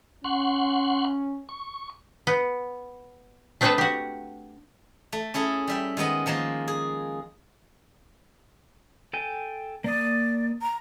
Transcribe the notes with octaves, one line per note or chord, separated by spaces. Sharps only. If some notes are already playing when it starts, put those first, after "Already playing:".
C#4 F#5 C6 C#6
C#6
B3
A3 C4 D4 G#4 A4 B4
F#4 G4
A3
C#4 E4 G#4 A4
G3 E5 G5
D#3 G#3 B3 D#5 B5
D#3 F3 G#3 A#3
G#4
A4 G5 G#5
A#3 D5 D#6
A#5